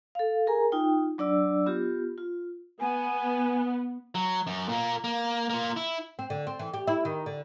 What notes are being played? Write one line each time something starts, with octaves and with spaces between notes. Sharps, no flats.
A4 F5
G#4 A#4 G#5 A#5
D#4 F4 G5
F#3 D4 D5 E6
B3 F4 G4
F4
B3 G#5
F#3
F#2
A#2 A#3
A#3
A#3 F4
E4
C4
D3
C4
E3
G4
E4
D#3
D3